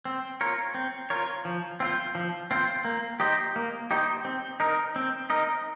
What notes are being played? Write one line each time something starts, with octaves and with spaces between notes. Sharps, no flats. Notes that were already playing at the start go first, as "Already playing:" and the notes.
C4
F4 A#4 C#5
C4
F4 A#4 C#5
F3
C4 F4 C5
F3
C4 F4 C5
A#3
D#4 G4 C5 D#5
A#3
D#4 G4 C5 D#5
C4
D#4 A#4 D#5
C4
D#4 A#4 D#5